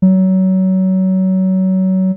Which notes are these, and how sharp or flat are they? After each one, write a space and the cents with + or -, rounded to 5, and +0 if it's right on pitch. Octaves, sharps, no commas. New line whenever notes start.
F#3 +25